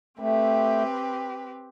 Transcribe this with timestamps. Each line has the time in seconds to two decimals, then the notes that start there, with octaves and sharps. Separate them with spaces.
0.19 A3 C4 G4 B4